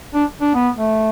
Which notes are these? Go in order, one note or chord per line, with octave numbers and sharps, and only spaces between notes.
D4
D4
B3
A3